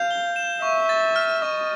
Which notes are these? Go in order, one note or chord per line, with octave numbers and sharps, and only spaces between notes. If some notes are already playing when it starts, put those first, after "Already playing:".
Already playing: F5 G6
G7
E7
E5 C#6
A6
F6
D#5 C#6